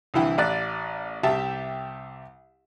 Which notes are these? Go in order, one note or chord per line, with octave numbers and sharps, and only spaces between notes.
C2 D3 E3 E4 G5
A1 D5 F#6
C2 G4 E5 G5 A5